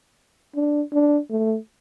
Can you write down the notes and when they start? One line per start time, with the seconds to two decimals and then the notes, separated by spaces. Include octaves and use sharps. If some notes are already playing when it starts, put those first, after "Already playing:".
0.56 D4
0.93 D4
1.30 A3